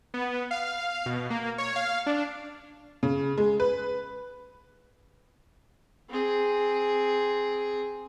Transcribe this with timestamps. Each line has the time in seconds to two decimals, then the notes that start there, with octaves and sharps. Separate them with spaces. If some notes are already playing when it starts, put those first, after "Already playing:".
0.14 B3
0.51 F5
1.06 B2
1.30 A#3
1.58 C#5
1.76 F5
2.06 D4
3.03 C#3
3.38 G#3
3.60 B4
6.09 C4 G#4